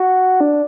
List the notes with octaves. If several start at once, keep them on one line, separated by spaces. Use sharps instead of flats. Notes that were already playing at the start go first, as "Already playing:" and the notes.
Already playing: F#4
D4